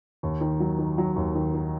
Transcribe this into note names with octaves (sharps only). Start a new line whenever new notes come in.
D#2
D#3
F#3
D#3
F#3
D#2
D#3
D#3